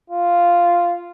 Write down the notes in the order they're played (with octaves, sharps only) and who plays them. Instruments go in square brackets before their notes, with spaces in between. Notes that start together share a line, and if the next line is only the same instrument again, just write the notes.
[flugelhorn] F4